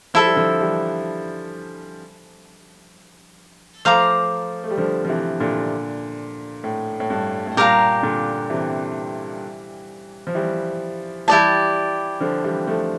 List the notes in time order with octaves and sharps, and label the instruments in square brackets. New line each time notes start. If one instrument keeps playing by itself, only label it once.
[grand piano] F3 [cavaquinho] E4 A4 E5
[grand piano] G3
D3 F3
E3 G3
[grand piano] F3 A3 [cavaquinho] C5 F5 A#5 D6
[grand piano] A3
G3
D3 F3
F3
C3 E3
A#2 D3
A2
A2
G2
A2
[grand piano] G2 A#2 [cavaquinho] G4 A#4 F5 A#5
[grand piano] A#2 D3
C3 E3
F3
E3 G3
[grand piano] E3 G3 [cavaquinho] E4 G4 D5 A5
[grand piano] D3 F3
E3 G3
F3 A3